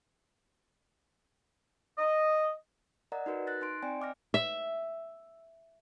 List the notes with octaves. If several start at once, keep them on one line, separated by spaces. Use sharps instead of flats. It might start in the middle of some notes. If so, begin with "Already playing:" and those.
D#5
A#4 D5 D#5 F#5 A#5
D#4 F#4 A#4 B4
F#6 A6 A#6
D#4 C6 D7
C4 D5 G5 G#5
D#5 D6 F6 A#6
E5